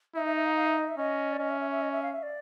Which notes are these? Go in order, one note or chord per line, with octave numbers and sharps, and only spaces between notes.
D#4 E5
E5
E5
F5
F5
E5
D#5
E5
C#4 D#5
D5
C#4 D#5
E5
E5
E5
D#5
E5
F5
E5
D5